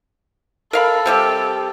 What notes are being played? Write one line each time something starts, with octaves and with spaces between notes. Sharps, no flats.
A4 A#4 F5 B5
C3 G3 G4